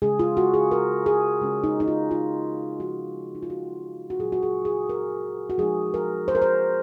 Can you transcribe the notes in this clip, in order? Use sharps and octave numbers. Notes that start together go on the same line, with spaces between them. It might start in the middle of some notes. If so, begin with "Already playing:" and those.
C#3 G#3 C#4 G#4
F4
F#4
G#4
A#4
G#4
C#3 G#3 C#4
D#4
D#4
F4
F4
F3 G#3 D#4 F#4
D#4
F4
F#4
F#4
A#2 F#3 A#3 G#4
F#4
G#4
G#4
A#4
F#4
F3 G#3 D#4 G#4
A#4
C5
A#4
C5